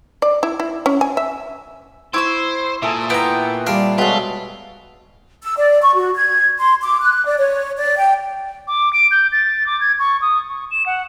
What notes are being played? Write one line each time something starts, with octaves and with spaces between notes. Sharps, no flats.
D5
E4
E4
C#4
G#5
E5
E4 C5 B5 C#6 D6 E6
A#2 G#4 A4 E5
B3 E4 G5 A#5
G3 D4 F5
B2 F#3 G#3 F4 A4 B5
E6
D5
C#6
F#4
G#6
C6
D6
F#6
D5
C#5
D5
G5
D6
D7
G6
A6
D6
G#6
C#6
D#6
C#6
E7
F#5